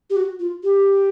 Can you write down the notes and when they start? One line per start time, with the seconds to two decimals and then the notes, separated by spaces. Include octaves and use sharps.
0.10 G4
0.16 F#4
0.40 F4
0.64 G4